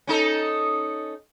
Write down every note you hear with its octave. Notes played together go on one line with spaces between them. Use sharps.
C#4 D#4 A4